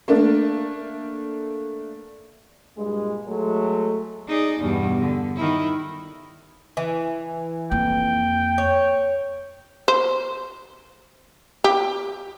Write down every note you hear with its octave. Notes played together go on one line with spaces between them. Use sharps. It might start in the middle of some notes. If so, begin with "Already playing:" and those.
A3 A#3 D4
G2 A#2 G#3
F#3 G#3 A3
D#4 G#4 D5
E2 G2 B2
D3
D#3 E4
E3
F2 A#3 G5
C#5
C5
G4